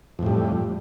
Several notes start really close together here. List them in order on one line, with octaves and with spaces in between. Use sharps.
F2 A2 G3